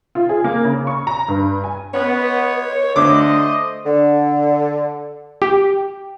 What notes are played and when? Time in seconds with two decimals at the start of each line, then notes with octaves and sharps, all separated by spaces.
0.15 F4
0.29 G#4
0.44 A#3
0.64 C#3
0.87 C#6
1.07 A#5
1.28 G2
1.64 G#5
1.94 B3 C#5
2.96 D3 A3 C5 D#5 D6
3.85 D3
5.42 G4